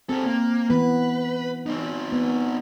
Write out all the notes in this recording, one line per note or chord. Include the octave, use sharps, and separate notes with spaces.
C4 G4 A4
A#3
E3 B3 B4
C4 D#4
B3